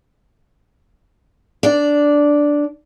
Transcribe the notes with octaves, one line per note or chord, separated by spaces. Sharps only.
D4 D5